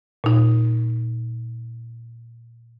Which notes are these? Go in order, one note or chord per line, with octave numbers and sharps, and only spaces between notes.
A#2 D#4